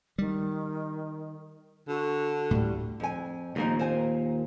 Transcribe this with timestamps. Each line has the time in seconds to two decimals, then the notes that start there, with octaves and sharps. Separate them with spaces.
0.18 D#3 G3
1.88 D3 F#4
2.51 D2 A2 G3
3.00 F2 G#5
3.56 D#2 A#2 F3 A#3 D#4
3.79 C5 F5 G#5